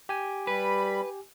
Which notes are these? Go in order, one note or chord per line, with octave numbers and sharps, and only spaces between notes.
G4 G#5
G3 B4 B5